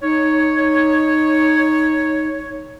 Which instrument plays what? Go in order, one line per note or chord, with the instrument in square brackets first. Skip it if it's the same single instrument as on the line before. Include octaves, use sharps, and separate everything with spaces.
[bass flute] D#4 [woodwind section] C#5